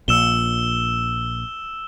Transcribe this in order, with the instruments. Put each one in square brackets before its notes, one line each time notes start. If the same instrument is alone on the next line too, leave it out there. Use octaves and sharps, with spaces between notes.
[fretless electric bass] A#1 A#2 [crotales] E6 E7 G7